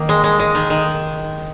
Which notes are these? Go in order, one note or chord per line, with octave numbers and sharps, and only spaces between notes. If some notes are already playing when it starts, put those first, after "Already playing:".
Already playing: D#3 A#3
G#3
G#3
G#3
D#3
D#3